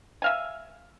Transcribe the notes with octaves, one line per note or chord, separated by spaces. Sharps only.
E5 F5 G#5